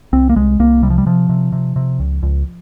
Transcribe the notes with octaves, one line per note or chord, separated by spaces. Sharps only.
C2 C4
A#3
C2 G#3
C2 A#3
C3 G3
F3
G3
C3 F3
C3
C3
C3
C#2
C#2